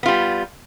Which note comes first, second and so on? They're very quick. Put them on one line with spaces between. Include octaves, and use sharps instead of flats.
B3 F4 G3